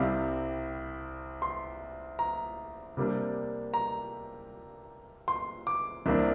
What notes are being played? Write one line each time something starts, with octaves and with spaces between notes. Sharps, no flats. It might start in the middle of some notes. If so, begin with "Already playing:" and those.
Already playing: C2 C3 G3 C4 F5
C6
A#5
C3 G3 A#3 D4
A#5
C6
D6
C2 C3 A#3 D4